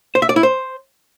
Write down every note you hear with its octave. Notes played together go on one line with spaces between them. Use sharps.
C5
E5
D5
E4
C5